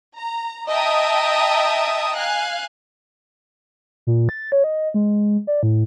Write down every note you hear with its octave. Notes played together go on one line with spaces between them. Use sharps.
A#5
D#5 E5 G5 A5 A#5 D#6
F5 G#5 F#6
A#2
A6
C#5
D#5
G#3
D5
A2